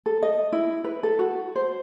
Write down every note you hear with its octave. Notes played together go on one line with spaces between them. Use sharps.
A4
D#5
E4
B4
A4
F#4
C5